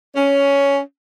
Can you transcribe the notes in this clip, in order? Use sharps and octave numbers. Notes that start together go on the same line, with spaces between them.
C#4